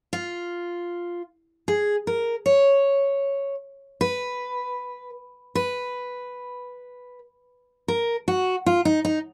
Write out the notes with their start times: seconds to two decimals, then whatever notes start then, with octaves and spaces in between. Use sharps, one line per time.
0.13 F4
1.68 G#4
2.07 A#4
2.46 C#5
4.01 B4
5.55 B4
7.88 A#4
8.28 F#4
8.66 F4
8.85 D#4
9.05 D#4